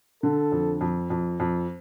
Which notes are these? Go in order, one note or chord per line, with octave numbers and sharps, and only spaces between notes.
D3 A4
F2
F2
F2
F2